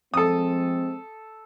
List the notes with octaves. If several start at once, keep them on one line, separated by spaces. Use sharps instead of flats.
F3 G#3 C4 A4 D#6